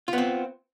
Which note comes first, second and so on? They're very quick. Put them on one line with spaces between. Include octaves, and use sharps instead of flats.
F4 B3 C4